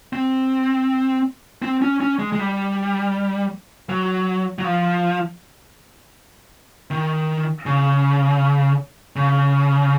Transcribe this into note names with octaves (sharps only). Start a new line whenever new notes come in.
C4
C4
C#4
C#4
G#3
G#3
G3
F#3
F#3
F3
D#3
C#3
C#3